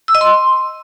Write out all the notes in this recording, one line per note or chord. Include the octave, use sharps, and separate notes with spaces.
E6
D#5
C6